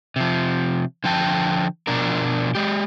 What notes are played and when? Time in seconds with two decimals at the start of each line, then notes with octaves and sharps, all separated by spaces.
0.16 C3 F3
1.04 D3 F3 G5 A5
1.87 B2 F3 D4 A#4
2.55 G#3 G4